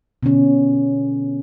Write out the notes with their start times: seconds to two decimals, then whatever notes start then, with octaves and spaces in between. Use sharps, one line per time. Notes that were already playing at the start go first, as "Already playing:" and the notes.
0.23 B2 D3 C#4